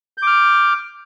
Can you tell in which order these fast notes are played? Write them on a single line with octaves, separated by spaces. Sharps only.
G6 D6 F6